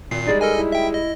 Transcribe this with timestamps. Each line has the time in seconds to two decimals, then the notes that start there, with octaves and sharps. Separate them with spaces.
0.11 G#1 A#2 C7
0.26 G3 G#3 D#4 D5
0.41 A4 A#4 D#5 G#5
0.56 E4
0.72 E5 G5
0.94 D#5